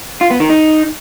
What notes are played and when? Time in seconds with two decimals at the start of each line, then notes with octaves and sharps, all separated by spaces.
0.21 F4
0.31 B3
0.40 D#3
0.50 D#4